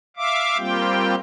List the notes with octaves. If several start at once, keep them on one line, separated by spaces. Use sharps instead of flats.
E5 F5 D6
G3 A#3 C4 F4 G4 G5